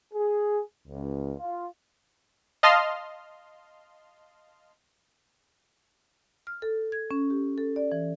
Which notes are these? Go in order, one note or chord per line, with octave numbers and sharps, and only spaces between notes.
G#4
C#2
F4
D#5 F5 A5 C6 F6
F6
A4
G#6
C#4
G4
A4
D5
E3